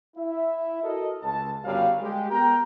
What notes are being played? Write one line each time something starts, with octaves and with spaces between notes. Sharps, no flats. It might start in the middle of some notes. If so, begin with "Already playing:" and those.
E4 E5
F#4 A4 A#4 D#5
C#2 A5
G1 F#2 F#3 G3 C#5 F5
G#3 G4
B3 A#4 G5 A#5